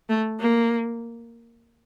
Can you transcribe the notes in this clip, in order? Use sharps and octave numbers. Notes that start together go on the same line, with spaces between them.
A3
A#3